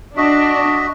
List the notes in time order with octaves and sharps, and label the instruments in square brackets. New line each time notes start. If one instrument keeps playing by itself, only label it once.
[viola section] D4 [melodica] F#4 D#5 E5